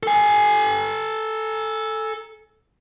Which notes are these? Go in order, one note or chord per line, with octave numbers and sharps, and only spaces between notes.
A4 G#5